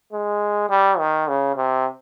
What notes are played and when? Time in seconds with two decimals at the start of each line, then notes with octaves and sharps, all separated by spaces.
0.13 G#3
0.70 G3
0.99 D#3
1.28 C#3
1.56 C3